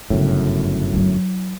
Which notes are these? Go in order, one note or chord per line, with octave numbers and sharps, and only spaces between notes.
G1 F#2 A2 C#3
F#3 E4